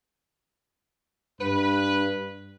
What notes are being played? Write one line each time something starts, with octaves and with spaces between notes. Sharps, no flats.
G2 B4